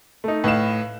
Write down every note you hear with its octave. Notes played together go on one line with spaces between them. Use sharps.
A3 D#4
A2 B4 D#5 F5 E7